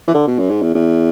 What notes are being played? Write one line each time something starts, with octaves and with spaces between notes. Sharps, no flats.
E3
D3
B2
F#2
G#2
E2
E2